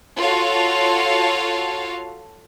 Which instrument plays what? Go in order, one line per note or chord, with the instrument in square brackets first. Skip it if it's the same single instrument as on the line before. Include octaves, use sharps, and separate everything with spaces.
[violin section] F4 F#4 A4 C#5 F5